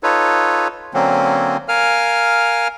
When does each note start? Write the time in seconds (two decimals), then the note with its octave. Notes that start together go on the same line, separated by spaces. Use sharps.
0.03 D#4 F4 A4 B4 C#5
0.94 D3 F#3 A#3 C4 C#4
1.68 A#4 F5 G#5 F6